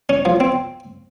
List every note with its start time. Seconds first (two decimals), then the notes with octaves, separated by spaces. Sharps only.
0.09 C#4
0.25 F3
0.40 C4